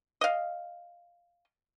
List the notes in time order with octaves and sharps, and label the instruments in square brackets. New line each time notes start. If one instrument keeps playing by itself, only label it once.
[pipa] D#5 F5